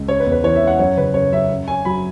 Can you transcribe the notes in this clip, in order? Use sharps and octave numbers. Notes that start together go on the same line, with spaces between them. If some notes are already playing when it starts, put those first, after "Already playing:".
Already playing: C#2
C#4 C#5
B4
E2
B4
E3 C#5
E5
C#4
F#5
F#2 C#5
C#3 B4
F#2 C#5
F#2 E5
F#2
C#4 G#5
F#3 B5